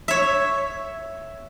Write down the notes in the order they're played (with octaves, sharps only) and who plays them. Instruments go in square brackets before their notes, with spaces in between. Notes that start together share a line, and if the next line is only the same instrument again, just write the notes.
[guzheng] C#5 E5